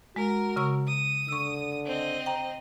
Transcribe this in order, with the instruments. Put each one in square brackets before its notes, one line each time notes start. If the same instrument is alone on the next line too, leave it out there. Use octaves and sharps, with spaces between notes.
[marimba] G#3 [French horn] F#4 [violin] A#4
[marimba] C#3 C#6 E6
[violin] D#6
[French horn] D3 [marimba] C#6 E6
[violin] C4 D#5
[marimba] G5 A#5